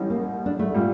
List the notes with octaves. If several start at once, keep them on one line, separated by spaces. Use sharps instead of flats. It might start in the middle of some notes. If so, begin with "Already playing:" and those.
Already playing: A1 A2 G3 C#4
A#3
D4
A3
A#2 G3